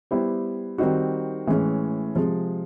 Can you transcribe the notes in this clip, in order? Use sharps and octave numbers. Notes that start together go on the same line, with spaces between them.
G3 B3 E4 G4 C5
D#3 G3 C4 D#4 F#4
A2 E3 G#3 C#4
C3 F3 G#3